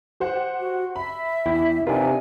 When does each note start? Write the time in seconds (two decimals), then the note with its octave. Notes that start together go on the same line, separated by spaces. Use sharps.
0.20 G4 C5 F#5
0.59 F#4
0.96 E5 B5
1.46 E2 E4 G5
1.87 C3 D4 D#4 F4 A#4 B4 G#5